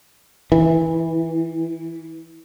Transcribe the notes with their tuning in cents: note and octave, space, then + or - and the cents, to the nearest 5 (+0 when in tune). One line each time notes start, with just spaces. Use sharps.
E3 -10